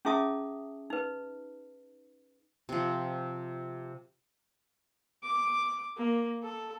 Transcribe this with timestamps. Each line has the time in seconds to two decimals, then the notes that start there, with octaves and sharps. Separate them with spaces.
0.05 C#4 E4 G#4 E5 A5 D#6
0.90 D#4 B4
2.69 C3 F3
5.23 D6
5.97 A#3
6.43 A4